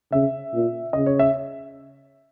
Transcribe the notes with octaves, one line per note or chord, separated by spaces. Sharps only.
C#3 E5
A#2
C#3 D#5
C#5
E5